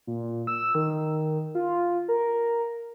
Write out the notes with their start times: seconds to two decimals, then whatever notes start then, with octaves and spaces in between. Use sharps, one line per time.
0.07 A#2
0.47 E6
0.75 D#3
1.55 F4
2.08 A#4